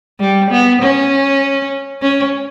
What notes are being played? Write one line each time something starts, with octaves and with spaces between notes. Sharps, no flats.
G3
B3
C#4
C#4